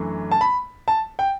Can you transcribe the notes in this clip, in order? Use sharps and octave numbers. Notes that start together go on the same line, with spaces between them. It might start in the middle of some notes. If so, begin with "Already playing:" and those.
Already playing: F#2 E3 A3 D4
A5
B5
A5
G5